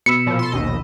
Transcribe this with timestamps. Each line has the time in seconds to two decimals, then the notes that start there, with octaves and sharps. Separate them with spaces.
0.06 B2 B5 E6 C#7
0.26 A#2 F3
0.39 A4 C6
0.52 A#1 D#2 D#5